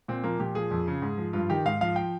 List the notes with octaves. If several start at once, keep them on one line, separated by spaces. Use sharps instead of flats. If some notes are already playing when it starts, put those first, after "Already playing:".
A#2 C4
F3 A#3
A#2 G4
F3 G#4
F2
C#3
G#2
F3
G2 F4
D#3 G4
G#2 F5
F3 F5
G5